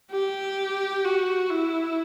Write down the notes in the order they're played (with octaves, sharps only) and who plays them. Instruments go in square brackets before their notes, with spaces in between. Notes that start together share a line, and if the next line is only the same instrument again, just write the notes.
[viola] G4
F#4
E4